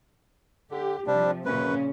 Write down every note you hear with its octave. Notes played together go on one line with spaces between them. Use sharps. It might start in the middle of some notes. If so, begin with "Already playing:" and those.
D3 G4
C3 F3 G3 D4
F#2 A#2 C#3 C#4 B4